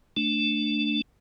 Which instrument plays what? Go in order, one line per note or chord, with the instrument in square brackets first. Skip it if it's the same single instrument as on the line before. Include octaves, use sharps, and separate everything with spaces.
[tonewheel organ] A3 D4